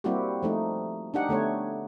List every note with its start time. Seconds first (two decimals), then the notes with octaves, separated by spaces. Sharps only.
0.04 G3 A#3 C4 E4 F#4 G4
0.43 F3 A3 D#4
1.14 D4 D#4 G4 F#5
1.29 D3 A3 B3 C#5